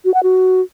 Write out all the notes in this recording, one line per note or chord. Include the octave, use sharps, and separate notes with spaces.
F#4
F#5
F#4